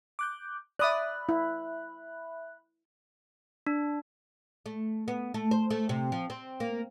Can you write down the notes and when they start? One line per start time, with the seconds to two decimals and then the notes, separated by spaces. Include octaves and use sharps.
0.19 D6 F#6 G6
0.79 D5 E5 B5 D#6 F#6
1.29 E4
3.67 D4
4.66 A3
5.08 B3
5.34 A3
5.51 C5
5.71 A3
5.89 C3
6.12 F3
6.30 C4
6.60 A#3